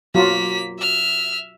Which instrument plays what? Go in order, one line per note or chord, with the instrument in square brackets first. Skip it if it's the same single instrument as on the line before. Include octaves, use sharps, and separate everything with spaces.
[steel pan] F#3 F4 F#4 [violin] A#3 B6
[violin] E5 F6